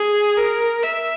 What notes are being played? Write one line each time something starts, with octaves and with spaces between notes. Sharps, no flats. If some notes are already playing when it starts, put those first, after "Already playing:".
Already playing: G#4
A#4
E5